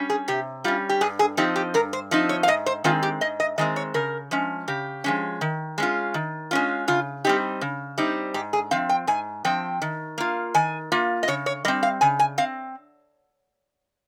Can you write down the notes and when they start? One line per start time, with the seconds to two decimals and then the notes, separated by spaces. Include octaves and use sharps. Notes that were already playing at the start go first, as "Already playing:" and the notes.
Already playing: G3 C#4
0.10 G#4
0.28 C3 G4
0.64 G3 C#4 F4
0.89 G4
1.01 G2 G#4
1.19 G#4
1.37 F3 C4 D#4 G4
1.56 G4
1.74 G2 A#4
1.93 C5
2.11 F3 C4 D#4
2.29 C#5
2.43 F5
2.48 G#2 D#5
2.66 C5
2.84 D#3 G#3 C4 F4
3.03 G4
3.21 G#2 D#5
3.40 D#5
3.58 D#3 G#3 C4 D#5
3.76 C#5
3.94 C#3 A#4
4.31 F3 G#3 C#4
4.68 C#3 G4
5.04 F3 G#3 C#4
5.41 D#3
5.78 G#3 C#4 F4
6.14 D#3
6.51 G#3 C#4 F4
6.88 C#3 F4
7.24 G3 C4 D#4 G4
7.61 C#3
7.98 G3 C4 D#4
8.34 G#2 G4
8.53 G#4
8.71 F3 C4 F5
8.89 G5
9.07 G#2 G#5
9.45 F3 C4 G5
9.82 D#3
10.18 A#3 F4
10.54 D#3 G#5
10.92 A#3 F4
11.23 D#5
11.28 C#3 C#5
11.46 C#5
11.65 G3 C4 D#5
11.83 F5
12.01 C#3 G#5
12.19 G#5
12.38 C4 F5